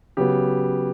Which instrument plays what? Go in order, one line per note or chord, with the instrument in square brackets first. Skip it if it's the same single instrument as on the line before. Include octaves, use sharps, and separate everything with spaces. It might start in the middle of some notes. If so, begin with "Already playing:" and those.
[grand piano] C#3 F#3 B3 G4